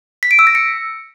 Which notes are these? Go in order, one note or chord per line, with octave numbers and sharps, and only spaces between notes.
B6
D7
E6
A#6
C#7